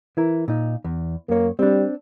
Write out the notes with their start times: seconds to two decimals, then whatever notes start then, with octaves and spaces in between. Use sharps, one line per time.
0.17 E3 E4 A#4
0.48 A#2 D#4
0.84 E2
1.29 F#2 A#3 C#5
1.59 G3 C4 D4